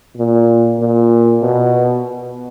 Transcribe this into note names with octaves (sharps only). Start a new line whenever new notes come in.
A#2
A#2
B2